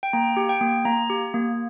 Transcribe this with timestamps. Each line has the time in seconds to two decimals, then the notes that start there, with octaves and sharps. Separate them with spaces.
0.03 G5
0.13 A#3 A#5
0.37 G4
0.49 G5
0.61 A#3
0.85 A#3 A#5
1.10 G4
1.34 A#3